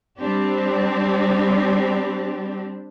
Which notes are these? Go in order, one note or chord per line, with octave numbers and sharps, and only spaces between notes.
G3 C4 D4 G4